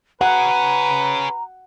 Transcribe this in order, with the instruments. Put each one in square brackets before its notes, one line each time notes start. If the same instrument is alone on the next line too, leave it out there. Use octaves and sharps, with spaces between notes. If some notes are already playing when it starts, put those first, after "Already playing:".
[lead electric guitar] C#4 G#4 [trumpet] B4 [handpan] F#5 [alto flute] A#5